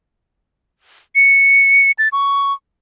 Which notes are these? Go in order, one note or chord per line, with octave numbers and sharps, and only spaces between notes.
C#7
A6
C#6